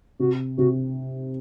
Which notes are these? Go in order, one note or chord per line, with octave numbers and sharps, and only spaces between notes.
C3 F#4
C3 F#4